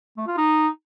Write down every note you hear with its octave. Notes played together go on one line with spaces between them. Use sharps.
A3
F4
D#4